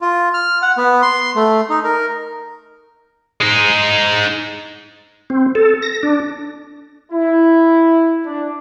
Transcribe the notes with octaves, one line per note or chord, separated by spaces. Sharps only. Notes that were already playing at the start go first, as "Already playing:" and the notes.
F4
F6
F#5
B3
C6
A3
D#4
A#4
G#3 D#4
C4
A4
A#6
D4
E4
D4